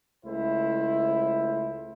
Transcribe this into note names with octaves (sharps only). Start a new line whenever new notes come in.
C#2 A3 E4 C5